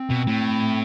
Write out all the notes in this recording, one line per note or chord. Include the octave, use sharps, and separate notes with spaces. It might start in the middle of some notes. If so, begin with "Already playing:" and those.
Already playing: C4
B2
A2